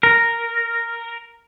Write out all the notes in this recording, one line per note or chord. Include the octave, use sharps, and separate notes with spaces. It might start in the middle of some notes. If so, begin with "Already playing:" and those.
A#4